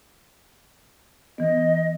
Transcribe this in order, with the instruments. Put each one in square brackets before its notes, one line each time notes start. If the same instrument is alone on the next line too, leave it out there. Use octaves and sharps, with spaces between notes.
[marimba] E3 B3 [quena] D#5